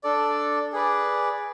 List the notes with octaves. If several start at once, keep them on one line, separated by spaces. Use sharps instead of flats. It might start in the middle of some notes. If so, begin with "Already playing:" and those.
D4 A4 D5
G#4 B4 D5